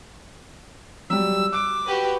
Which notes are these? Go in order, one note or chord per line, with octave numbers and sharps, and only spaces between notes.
F#3 G3 E6
D6 F#6 D7
F#4 G4 B4